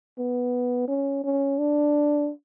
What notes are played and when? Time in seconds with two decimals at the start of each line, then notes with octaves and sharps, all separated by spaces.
0.18 B3
0.88 C#4
1.24 C#4
1.59 D4